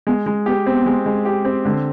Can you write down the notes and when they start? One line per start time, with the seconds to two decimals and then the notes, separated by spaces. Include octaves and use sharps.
0.07 G#3 B3
0.26 G#3
0.46 B3 G4
0.66 B3 C4
0.86 G#3
1.06 G#3
1.25 G4
1.45 C4
1.65 D3 G#3